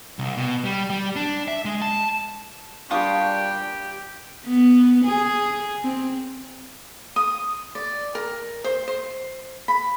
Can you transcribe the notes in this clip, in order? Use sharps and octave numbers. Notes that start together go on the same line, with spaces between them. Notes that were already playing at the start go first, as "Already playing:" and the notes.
C2
B2
G3
G3
D4
E5
G#3
A5
A#2 G3 D4 F4 G4 C#6 D#6
B3
G#4
C4
D#6
D5
A#4
C5
C5
B5